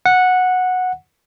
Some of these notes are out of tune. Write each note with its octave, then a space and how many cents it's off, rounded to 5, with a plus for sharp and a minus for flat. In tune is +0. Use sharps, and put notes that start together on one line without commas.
F#5 -10